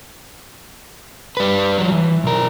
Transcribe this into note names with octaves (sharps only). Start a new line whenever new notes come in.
G3 B4
F3 F#3
E3
B1 A#4